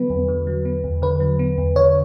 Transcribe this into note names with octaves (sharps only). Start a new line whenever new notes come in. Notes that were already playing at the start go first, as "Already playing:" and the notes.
Already playing: D3 F#3 B3 B4
E2
D3
F#3
B3
E2
D3 B4
F#3
B3
E2
D3 C#5